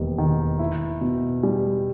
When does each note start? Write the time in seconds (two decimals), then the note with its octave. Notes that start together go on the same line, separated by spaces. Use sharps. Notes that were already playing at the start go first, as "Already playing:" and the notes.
Already playing: E1 D#2 G3
0.18 D#3
0.59 E4
1.01 B2
1.43 G3